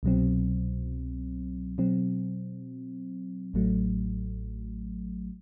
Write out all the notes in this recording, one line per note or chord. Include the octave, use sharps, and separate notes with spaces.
C2 B2 F#3 C4
B2 F#3 C4
A1 A2 F#3 A3